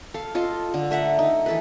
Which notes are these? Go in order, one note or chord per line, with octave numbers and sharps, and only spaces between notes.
A4 F5
F4 A4 D#5
D3
A3 E5 F#5 A#5
D#4
E3 A4 B4